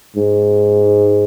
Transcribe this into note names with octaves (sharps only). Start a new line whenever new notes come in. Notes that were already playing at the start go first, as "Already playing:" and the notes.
G#2